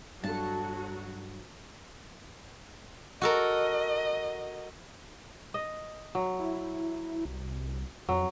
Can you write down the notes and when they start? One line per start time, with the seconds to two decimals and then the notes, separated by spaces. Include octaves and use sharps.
0.24 G2 F#3 D4 F#4 A4 A5
3.22 F#4 A4 A#4 D#5
5.54 D#5
6.15 F#3
6.39 E4
7.25 C2
8.09 F2 F#3